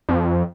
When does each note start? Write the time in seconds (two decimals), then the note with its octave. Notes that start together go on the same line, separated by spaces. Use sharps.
0.09 F2